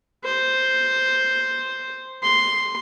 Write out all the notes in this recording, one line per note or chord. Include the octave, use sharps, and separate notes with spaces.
C5
C6